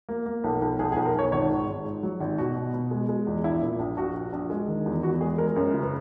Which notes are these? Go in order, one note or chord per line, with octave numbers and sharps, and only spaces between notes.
A#3
A#3
B1
B1
B1 G#4
G#4
B1
A#4
B1 C#5
G#1 C#5
G#2
G#1
G#2
F#3
G#1
B2 F#4
B2
B2
G#3
G#3
E2
A#1 E4
A#2
A#1
A#1 F#4
A#1
A#1
G#3
D#3
E2
E2 F#4
G#3 G#4
G#3 A#4
F#2 A#4
C#3
B4